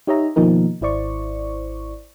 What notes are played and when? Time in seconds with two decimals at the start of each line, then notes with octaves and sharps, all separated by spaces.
0.07 D#4 G4 C#5 D#5 E5 A#5
0.36 B2 D#3 F3 A#3 D#4 A#4
0.81 G#1 E4 C5 D5 C#6